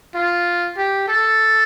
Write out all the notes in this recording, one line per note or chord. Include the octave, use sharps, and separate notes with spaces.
F4
G4
A4